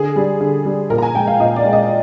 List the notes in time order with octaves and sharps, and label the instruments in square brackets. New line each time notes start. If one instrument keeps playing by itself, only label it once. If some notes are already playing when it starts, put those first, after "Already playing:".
Already playing: [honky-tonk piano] D3 G#4
G3
D3
G3
A#2 A#4
A#5
G#5
G#3 G5
F5
A#2 D#5
D5
G#3
D#5